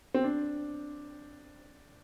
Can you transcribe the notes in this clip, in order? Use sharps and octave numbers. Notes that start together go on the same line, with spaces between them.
C4
D4